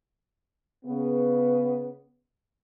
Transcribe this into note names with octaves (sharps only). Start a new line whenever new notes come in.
C#3 B3